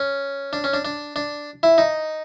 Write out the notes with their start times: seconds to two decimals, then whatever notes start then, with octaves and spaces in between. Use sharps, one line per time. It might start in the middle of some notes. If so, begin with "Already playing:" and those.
Already playing: C#4
0.53 D4
0.64 C#4
0.74 D4
0.85 D4
1.16 D4
1.63 E4
1.78 D#4